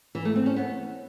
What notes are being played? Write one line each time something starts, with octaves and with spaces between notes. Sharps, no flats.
E3
A3
C4
C#4
B3